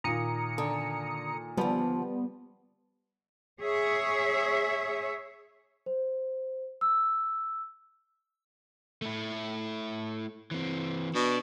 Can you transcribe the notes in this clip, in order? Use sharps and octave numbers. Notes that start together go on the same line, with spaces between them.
A#2 D#3 F4 A#5 D#6 C#7
D3
D3 F3 G3 B3
G#4 C#5 E5
C5
E6
A3 E4
E3 C4
B2 D4